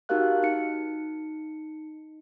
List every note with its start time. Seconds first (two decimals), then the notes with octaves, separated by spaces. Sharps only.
0.09 D#4 F#4 G4 A#4 F5 F#6
0.43 D#4 C#7